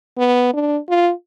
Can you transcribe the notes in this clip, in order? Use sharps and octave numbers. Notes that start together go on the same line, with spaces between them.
B3
D4
F4